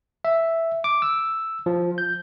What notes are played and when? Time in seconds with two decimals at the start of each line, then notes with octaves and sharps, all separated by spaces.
0.25 E5
0.84 D6
1.02 E6
1.66 F3
1.98 G6